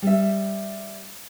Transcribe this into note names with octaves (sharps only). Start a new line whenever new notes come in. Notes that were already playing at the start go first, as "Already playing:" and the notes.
G3 E5